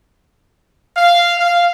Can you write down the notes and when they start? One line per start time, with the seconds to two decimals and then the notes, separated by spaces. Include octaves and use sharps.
0.96 F5
1.39 F5